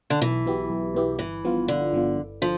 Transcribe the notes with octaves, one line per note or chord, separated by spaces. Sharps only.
D3
B1 E3
B2 B3 E4 G4
B1
B2 B3 E4 G4
G1 E3
G2 F3 B3 F4
G1 D3
G2 F3 B3 F4
G1
D3 F3